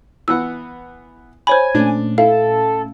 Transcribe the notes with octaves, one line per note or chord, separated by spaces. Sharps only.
E3 B3 F#5 E6
C5 C#5 G#5 B5
A#2 A3 C#4 D4
E4 A4 F5